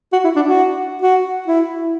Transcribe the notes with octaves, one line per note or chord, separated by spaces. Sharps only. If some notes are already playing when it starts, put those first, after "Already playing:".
F#4
E4
D4
F#4
F#4
E4